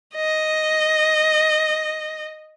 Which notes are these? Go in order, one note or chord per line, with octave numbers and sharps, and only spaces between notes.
D#5